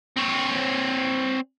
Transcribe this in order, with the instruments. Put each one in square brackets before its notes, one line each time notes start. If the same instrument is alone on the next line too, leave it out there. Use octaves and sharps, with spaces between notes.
[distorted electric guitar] C4 C#5